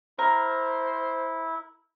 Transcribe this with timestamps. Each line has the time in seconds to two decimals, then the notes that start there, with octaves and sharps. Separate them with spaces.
0.19 E4 A#4 C5